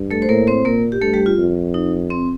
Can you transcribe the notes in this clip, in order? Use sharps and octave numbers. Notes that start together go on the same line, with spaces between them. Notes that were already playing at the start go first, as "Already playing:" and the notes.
Already playing: G2
A3 A4
C5
A2 A#3 A#4
C4 C5
A#2 A#3 A#4
G4
G2 A3 A4
G3 G4
F4
F2
D#4
C4